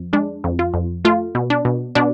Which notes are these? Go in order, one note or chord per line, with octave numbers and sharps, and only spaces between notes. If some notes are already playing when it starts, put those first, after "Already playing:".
Already playing: F2
G#3 D4
F2
F4
F2
A3 F4
B2
D4
B2
B2 D4